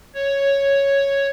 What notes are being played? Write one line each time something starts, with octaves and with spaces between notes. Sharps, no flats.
C#5